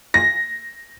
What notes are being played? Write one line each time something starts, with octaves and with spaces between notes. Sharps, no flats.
A#6